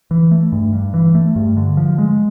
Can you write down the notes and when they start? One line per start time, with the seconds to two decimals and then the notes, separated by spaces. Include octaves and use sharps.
0.11 E3
0.31 A3
0.52 G2
0.73 G2
0.94 E3
1.15 A3
1.36 G2
1.57 D3
1.77 F3
1.98 G#3